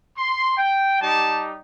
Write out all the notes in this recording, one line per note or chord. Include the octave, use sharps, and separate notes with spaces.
C6
G5
G3 D#4 G4 A5